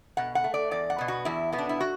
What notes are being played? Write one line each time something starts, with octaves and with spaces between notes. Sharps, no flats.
B2 F#5
F#5
A3
D5
E2 D5
F#5
B2 B3
F#4
E2 E4
B2 B3
D4
E4
F#4